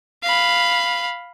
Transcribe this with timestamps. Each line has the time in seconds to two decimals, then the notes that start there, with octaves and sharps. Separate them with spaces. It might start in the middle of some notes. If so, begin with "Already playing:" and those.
0.23 F5 B5